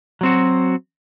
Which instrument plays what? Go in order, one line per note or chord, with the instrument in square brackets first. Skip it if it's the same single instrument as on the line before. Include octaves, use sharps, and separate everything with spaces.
[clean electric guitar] F#3 C4 F#4